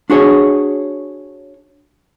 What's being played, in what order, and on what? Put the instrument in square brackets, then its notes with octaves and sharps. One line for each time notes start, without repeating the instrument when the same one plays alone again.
[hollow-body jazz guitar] D4 F#4 G#4 C#5